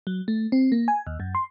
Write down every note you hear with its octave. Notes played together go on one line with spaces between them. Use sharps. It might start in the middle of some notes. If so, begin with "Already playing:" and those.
F#3
A3
C4
A#3
G#5
D#2
F#2
C6